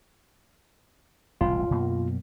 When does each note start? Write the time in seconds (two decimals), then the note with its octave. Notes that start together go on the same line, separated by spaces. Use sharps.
1.41 E1 C2 A2 F4
1.71 F#2 B2 A#3